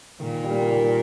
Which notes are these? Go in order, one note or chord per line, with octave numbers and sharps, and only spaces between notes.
A#2 D#3
G3 A#3
D#3